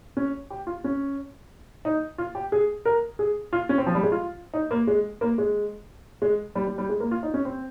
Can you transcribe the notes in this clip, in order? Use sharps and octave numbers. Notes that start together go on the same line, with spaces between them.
C#4
G4
F4
C#4
D#4
F4
G4
G#4
A#4
G#4
F4
C#4
C4
F3
G3
G#3
F4
D#4
A#3
G#3
A#3
G#3
G#3
G3
G3
G3
G#3
A#3
F4
D#4
C#4
C4